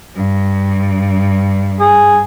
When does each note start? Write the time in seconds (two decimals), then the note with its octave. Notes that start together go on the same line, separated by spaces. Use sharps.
0.15 G2
1.80 G#4